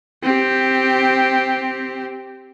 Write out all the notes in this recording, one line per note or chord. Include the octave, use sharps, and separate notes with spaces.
C4 G4